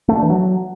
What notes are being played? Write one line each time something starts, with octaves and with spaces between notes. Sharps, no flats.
A3
D4
E3
F#3